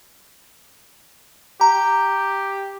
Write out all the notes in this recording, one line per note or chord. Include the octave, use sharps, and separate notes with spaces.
G4 A#5